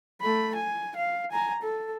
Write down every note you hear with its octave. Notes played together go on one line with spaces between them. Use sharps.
A3 B5
G#5
F5
G#5 A#5
A4